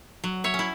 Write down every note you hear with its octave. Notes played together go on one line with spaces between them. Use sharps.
F#3
C#5 E5
C#4
E4